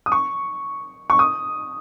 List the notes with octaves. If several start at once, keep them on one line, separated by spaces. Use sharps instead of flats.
D#6
C#6
C#6
D#6